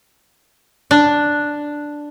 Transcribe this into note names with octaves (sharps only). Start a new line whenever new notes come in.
D4